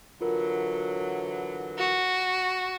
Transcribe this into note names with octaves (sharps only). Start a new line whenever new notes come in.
D3 E3 F#3 F4 A#4
F#4